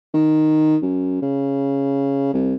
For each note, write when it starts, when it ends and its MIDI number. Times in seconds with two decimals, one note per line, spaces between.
0.14 0.76 51
0.82 1.20 42
1.22 2.31 49
2.34 2.54 36